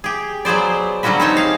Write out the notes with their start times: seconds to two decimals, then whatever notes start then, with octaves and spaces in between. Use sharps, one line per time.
0.04 G4 G#4
0.45 F#3 B3 G#4 C5 D5
1.03 D3 F#3 G3 C#4 F#4 B4
1.20 C4 D#4 C#5 A5
1.37 G#4 F5